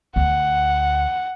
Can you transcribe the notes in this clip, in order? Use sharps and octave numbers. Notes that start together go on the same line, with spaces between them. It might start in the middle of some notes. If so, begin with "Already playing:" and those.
D2 F#5